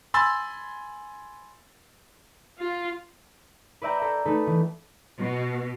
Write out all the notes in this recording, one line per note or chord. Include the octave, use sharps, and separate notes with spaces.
G#5 B5 C6 E6 A6
F4
B4 D5 E5 G5 A#5
A4 E5 A#5
A3 D#4 A4 B4
E3
B2